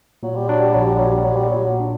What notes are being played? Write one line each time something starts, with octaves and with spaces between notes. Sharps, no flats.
A#2 F#3
G3
F#3 D4
G3
A#1 F#3
G3
A#2 F#3
G3
A#2 F#3
G3
F#3
A#2
D4